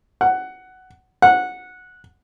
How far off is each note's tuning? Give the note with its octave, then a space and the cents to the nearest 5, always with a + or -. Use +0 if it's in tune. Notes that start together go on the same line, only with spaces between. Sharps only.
F#5 +10
F#5 -15